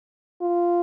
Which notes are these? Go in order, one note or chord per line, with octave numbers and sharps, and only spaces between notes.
F4